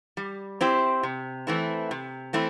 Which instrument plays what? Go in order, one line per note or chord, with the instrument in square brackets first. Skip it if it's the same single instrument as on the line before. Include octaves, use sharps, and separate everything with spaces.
[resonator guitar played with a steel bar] G3
C4 E4 G4 C5
C3
E3 A3 C4 E4
C3
E3 A3 C4 E4